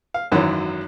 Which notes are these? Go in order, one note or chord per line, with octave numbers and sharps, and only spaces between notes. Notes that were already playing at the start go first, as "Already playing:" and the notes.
F5
G#1 F#2 D#3 E3 F#3